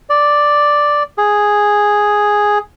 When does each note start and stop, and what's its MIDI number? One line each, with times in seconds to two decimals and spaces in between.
0.10 1.03 74
1.18 2.58 68